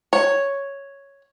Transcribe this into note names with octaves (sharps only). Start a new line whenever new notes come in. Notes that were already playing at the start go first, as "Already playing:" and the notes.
C#5